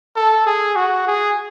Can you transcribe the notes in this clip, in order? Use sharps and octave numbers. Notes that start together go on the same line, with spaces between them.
A4
G#4
F#4
G#4